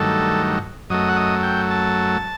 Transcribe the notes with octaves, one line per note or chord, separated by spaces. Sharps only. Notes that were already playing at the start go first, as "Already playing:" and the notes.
Already playing: G2 D#3 F#3 A3 A4
F#2 F#3 A3 D#5
F#5
D#5
G5
A5